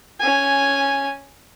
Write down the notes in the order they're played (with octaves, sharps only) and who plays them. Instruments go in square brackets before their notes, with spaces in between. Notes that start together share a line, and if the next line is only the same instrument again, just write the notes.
[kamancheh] C#4 G#5